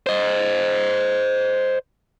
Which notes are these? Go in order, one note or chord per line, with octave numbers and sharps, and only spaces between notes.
C5 D#5